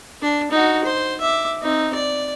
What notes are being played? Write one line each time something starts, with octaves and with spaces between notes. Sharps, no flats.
D4
D#4 F#4
C5
E5 D6
C4 D#4
D5